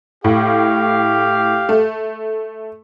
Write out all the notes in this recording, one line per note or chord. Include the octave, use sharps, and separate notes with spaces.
A2 G4 F5
A3